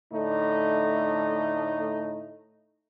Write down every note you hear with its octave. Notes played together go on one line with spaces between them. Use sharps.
A2 D3 A3 D#4